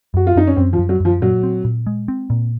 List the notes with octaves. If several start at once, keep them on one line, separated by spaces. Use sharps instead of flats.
F#2 F#4
F4
F#2 D#4
C#4
F#2 C4
F3
F#2
F#3
F#2 F3
A#2 F#3
C4
A#2
G#3
C4
A#2